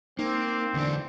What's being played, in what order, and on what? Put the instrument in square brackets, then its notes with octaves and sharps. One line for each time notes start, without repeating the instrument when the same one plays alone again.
[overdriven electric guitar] A#3 [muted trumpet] C4 [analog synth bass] D#4
[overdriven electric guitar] E2 D4 [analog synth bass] D3